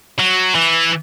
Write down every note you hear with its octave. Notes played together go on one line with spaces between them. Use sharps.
F#3
E3